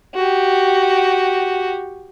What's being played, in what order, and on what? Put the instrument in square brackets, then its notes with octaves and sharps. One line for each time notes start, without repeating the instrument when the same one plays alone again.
[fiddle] F#4 G4